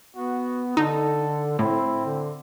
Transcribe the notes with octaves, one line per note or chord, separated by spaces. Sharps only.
B3 F#4
D3 D#4 A4
A2 C4 E4
D3